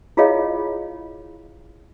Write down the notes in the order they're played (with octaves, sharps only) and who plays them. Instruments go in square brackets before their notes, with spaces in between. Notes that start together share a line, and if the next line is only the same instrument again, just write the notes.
[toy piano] E4 F4 G#4 C#5 D#5 F5